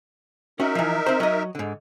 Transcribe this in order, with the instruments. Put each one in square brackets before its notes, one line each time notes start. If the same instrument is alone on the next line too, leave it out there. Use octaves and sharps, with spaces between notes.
[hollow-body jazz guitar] C#4 F#4 [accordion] D#4 A#4 E5
[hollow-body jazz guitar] E3 F3
C4 C5
F#3 D#5
G#2 D3